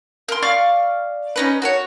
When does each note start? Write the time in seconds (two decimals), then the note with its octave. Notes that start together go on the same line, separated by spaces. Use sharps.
0.29 A#4 C6
0.42 D5 F5 C#6 F6
1.36 C#4 D#4 B4
1.62 F#4 A#4 C#5